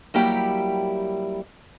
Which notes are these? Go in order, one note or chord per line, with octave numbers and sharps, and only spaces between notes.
F#3 G3 A#3 E4 G4 G5